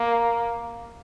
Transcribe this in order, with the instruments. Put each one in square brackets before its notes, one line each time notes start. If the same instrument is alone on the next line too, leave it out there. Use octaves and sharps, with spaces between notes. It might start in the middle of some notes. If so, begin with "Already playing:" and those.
Already playing: [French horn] A#3